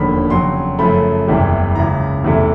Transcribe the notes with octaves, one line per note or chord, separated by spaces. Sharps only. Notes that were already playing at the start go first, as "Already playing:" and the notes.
Already playing: E1 D#2 D3 F3 A#3 B5
F2 C#3 F#3 C6
F#2 C#3 F3 A3 B5
F#1 E2 C3 E3 G3
C#2 C#3 E3 A#5
E2 C3 E3 A3